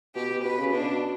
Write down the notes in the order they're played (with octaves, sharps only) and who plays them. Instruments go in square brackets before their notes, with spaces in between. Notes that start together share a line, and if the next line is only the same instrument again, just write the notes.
[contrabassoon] B2 [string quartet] G4
[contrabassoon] B2
[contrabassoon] B2 [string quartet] B4
[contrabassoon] C#3
[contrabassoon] B2 [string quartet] D4